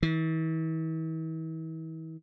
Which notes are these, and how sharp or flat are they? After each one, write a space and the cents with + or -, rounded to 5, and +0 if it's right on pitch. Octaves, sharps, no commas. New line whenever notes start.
E3 -45